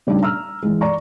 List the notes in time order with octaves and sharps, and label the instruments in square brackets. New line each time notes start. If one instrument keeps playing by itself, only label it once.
[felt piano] C#3 G3 A3 D4 D#4
A#5 E6 F6
E3 G#3
D5 A#5 C#6